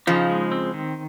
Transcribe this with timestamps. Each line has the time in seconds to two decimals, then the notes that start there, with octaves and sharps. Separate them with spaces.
0.07 C#3 F3 D#4
0.29 G#3
0.51 C4
0.74 D#3